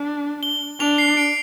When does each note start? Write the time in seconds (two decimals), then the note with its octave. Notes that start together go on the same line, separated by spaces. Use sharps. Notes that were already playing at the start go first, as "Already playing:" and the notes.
Already playing: D4
0.43 G7
0.80 D4 F7
0.98 C7
1.17 D7